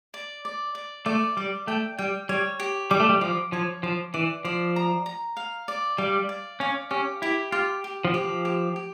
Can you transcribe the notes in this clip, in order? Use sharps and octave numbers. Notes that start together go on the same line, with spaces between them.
D5
D5
D5
A3 D5
G3 D5
A3 G5
G3 G5
G3 C#5
G4
G3 D6
A3
G3
F3 D6
F3 C#5
F3 D6
E3 D5
F3 D5
A#5
A#5
F5
D5
G3 F5
D5
C#4 F5
C#4 G4
E4 G4
F4 G4
G4
F3
G4
F3
G4
G4